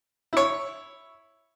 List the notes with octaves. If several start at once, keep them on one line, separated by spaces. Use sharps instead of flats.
E4 C#5